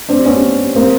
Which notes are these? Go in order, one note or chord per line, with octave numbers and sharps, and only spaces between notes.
C4 D4
B3 C#4
A#3 C4